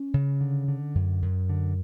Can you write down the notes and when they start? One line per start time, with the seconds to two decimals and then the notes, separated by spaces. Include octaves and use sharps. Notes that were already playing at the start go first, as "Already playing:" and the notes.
Already playing: C#4
0.14 C#3
0.41 D3
0.68 D3
0.95 F#2
1.22 F#2
1.49 D3